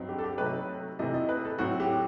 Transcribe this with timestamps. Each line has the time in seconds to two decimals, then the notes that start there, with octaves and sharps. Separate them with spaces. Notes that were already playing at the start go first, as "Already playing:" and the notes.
Already playing: G2 F#3 C4 D#4
0.09 G4
0.19 A4
0.24 G4
0.38 C3 F#3 A3 D#4 B4
0.99 C3 E3 A3 C4 D#4 D#5
1.14 D#5
1.29 B4
1.45 A4
1.58 A2 F#3 C4 F#4
1.80 G4